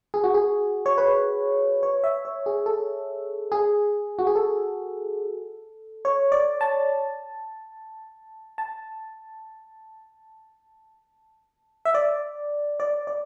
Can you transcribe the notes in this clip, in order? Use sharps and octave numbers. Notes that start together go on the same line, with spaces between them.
G#4
F#4
G#4
C#5
B4
C#5
E5
C#5
G#4
A4
G#4
F#4
G#4
A4
C#5
D5
A5
A5
E5
D5
D5
D5